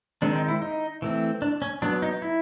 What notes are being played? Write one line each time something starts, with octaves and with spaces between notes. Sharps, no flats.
D#3 G#3 C4 D4
D#4
E4
D#4
E3 A3 C4
D4
C#4
F#3 B3 D4
D#4
E4